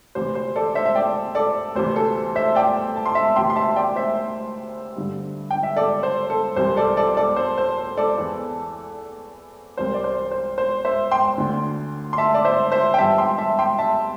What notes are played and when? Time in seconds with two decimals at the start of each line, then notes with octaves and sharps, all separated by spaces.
0.15 D2 C3 E3 C5
0.35 C5
0.56 A4 D5
0.75 C5 E5
0.86 E5
0.95 D5 G5
1.35 A4 D5
1.75 D2 C3 E3 C5
1.96 A4
2.35 C5 E5
2.55 D5 G5
2.96 A5
3.06 C6
3.15 E5 A5
3.36 D2 C3 E3 G5 C6
3.50 C6
3.56 E5 A5
3.76 D5 G5
3.96 C5 E5
4.96 G2 D3
5.51 G5
5.63 E5
5.76 A4 D5
6.03 C5
6.30 A4
6.56 C2 C3 E3 C5
6.76 A4 D5
6.97 A4 D5
7.17 A4 D5
7.36 C5
7.58 C5
7.97 A4 D5
8.17 E2 E3
9.77 C2 C3 E3 C5
9.94 D5
10.04 C5
10.31 C5
10.58 C5
10.85 C5 E5
11.11 G5 C6
11.38 D2 D3
12.13 C6
12.18 E5 A5
12.34 D5
12.45 C5 E5
12.72 C5 E5
12.94 G5
12.98 G2 E3 E5 A5
13.18 G5 C6
13.38 E5 A5
13.59 G5 C6
13.79 E5 A5